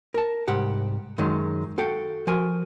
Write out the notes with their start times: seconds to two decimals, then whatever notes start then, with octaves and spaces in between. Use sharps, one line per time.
0.14 A#4 A5
0.48 C2 G#2 G4 F#5
1.18 F#2 D#3 F#3 G#3
1.78 F#4 A4 F5 G5
2.27 F3 F#4 A#4 G#5 C6